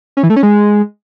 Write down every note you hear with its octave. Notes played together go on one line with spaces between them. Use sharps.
C#4
E3
A3
C#4
G#3